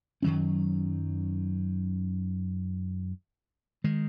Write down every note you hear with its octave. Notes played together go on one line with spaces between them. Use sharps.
F#2 D#3 F#3 C#4
D#3 G#3